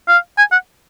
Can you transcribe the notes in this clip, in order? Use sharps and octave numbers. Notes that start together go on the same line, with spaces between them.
F5
G#5
F#5